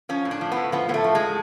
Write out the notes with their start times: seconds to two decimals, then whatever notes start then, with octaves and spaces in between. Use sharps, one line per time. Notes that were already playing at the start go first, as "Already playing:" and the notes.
0.09 F3 C#4
0.25 A2
0.31 D4
0.41 F3
0.52 B3
0.57 A2
0.72 F3 B3
0.89 A2 B3
0.94 A3
1.04 F3
1.15 G#3
1.20 A2